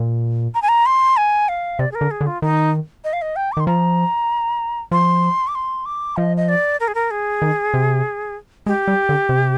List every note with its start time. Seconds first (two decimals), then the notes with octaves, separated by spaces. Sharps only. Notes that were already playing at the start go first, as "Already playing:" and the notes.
Already playing: A#2
0.54 A#5
0.62 G#5
0.68 A#5
0.86 C6
1.17 G#5
1.48 F5
1.79 C3 D5
1.91 G#4
1.95 A#4
2.01 D3
2.11 G#4
2.21 D3
2.26 F4
2.42 D#3 D#4
3.04 D#5
3.13 F5
3.22 D#5
3.36 G5
3.52 D6
3.57 D#3 C6
3.67 F3 A#5
4.91 F3 C6
5.47 D6
5.55 C6
5.86 D6
6.16 F3 D#5
6.37 D#5
6.48 D5
6.80 A#4
6.88 G#4
6.95 A#4
7.11 G#4
7.42 D#3
7.74 C3
8.66 G#3 G4
8.88 G3
9.09 D3
9.29 C3